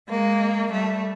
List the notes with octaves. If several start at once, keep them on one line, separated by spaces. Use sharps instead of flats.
G#3 A#3
G3 A3